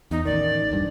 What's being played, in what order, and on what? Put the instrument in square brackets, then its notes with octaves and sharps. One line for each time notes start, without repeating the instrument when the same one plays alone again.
[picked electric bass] E2 [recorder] D#4
[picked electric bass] A1 D#3 [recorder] D5
[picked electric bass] D1 G2